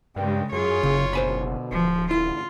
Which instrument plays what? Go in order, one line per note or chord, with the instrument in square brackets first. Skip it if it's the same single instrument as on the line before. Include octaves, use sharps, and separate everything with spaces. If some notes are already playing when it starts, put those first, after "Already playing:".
[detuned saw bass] G2 [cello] C#3 G#3 [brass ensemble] A#4 D5 G5
[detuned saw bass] F#2 [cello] F4 C#5 [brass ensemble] G#4
[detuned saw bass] F#1 [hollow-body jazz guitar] C#3
[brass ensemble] B2 D3 [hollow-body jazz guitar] C5 G#5 B5
[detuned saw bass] D1 [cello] F3
[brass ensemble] A1 E2 D3 [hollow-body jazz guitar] E4 [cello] F4